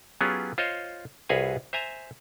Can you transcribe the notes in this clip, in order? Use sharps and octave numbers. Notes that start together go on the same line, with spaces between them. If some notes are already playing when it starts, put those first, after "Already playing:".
F#3 B3 C#4 F4 G4 G#4
F4 C5 C#5 D#5
C2 F#4 G#4 B4 F5 G#5
C5 E5 G#5 A#5